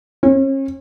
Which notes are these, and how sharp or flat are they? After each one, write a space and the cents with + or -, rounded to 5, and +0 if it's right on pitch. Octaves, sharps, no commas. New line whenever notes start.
C#4 -40